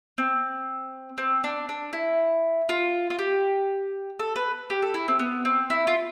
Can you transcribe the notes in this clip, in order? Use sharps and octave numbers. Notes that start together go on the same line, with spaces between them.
C4
C4
D4
D4
E4
F4
F4
G4
A4
B4
G4
A4
E4
C4
B3
C4
E4
F4